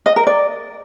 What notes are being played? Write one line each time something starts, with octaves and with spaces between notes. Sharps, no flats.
D#5
A#4
D5